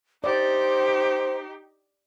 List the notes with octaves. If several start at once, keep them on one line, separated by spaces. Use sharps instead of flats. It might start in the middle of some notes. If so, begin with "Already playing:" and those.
D#4 G4 C5 D5